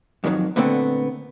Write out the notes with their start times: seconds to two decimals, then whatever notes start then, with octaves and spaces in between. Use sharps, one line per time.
0.24 F2 G#2 D#3 F#3
0.56 A#2 D3 A3 B3 C4